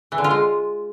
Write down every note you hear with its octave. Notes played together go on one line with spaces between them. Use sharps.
E3
D3
F4
G#3